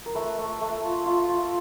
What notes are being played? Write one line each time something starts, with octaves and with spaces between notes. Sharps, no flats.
A#4
A3 B4
A3
A3
F4
F4
F4